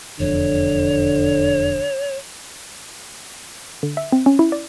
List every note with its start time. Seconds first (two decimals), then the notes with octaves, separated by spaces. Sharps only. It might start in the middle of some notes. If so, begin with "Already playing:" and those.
0.20 E1 F2 D3 C#5
3.83 D3
3.97 E5
4.12 C4
4.26 C#4
4.39 E4
4.52 D5